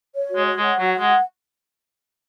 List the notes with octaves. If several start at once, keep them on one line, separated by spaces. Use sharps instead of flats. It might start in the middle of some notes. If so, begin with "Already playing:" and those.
C#5
F#4
G#3
C#5
G#3
F#5
F#3 F#4
F#5
G#3